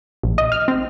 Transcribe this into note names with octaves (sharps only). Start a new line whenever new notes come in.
A#1
D#5
F6
C4